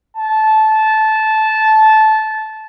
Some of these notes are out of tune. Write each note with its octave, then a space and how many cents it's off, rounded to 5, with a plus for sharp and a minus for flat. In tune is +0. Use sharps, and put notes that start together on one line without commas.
A5 -15